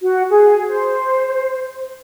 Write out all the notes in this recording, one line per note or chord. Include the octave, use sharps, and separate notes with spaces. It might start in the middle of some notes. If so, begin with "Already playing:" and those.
F#4
G#4
C5